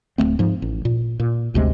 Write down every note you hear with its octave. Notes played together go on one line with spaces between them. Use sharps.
D1 G#2 A3 C4
G#2 F3
A1
A#2
A#2
G1 D2 C3 G#3